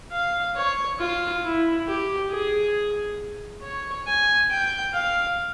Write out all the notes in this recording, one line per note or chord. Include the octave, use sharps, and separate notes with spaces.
F5
C#5
F4
E4
G4
G#4
C#5
G#5
G5
F5